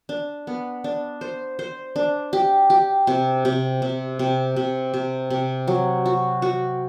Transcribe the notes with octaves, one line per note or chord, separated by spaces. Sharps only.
D4
B3
D4
C5
C5
D4
G4
G4
C3
C3
C3
C3
C3
C3
C3
F#3
F#4
F#4